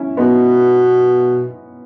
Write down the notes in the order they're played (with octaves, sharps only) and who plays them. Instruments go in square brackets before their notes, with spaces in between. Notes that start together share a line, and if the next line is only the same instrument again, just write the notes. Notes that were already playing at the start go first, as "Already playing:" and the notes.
Already playing: [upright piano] C#4 E4
[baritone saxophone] B2 [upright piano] B3 D#4